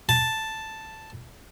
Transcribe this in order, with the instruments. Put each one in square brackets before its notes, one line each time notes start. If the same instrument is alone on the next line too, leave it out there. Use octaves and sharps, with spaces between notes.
[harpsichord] A5